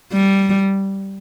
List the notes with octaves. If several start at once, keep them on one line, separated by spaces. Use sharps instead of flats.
G3